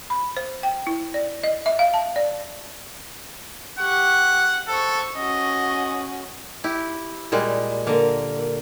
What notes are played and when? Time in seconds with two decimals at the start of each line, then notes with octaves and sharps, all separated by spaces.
0.10 B5
0.37 C5
0.63 G5
0.87 E4
1.14 D5
1.44 D#5
1.66 E5
1.79 F5
1.94 A5
2.16 D5
3.79 G4 F#5 C#6
4.68 A4 C5 C#6
5.16 C#4 F#4 D#5
6.64 E4 G4
7.32 A#2 G3 G#3
7.87 D3 A#3 A#4